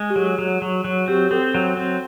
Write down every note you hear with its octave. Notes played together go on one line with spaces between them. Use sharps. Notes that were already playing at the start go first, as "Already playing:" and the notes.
Already playing: G#3
G4
F#3 G#4
F#3
F#3
F#3
C4 G4
C4 A4
F#3
C4